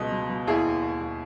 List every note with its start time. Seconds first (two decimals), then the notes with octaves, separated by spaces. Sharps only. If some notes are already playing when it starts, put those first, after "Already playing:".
Already playing: C#2 B2 D#5
0.12 B2
0.29 B2
0.47 D#2 E4 G#4
0.65 D#2
0.82 D#2
1.00 D#2